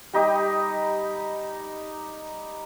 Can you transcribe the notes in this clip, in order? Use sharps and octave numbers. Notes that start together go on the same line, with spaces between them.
G3 D#4 G4